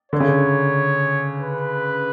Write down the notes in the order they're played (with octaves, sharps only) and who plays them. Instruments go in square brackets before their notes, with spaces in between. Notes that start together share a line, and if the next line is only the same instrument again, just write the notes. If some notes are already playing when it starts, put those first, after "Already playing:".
[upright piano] D3 [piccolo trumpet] C#5
[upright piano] C#3
D3
[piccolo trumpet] B4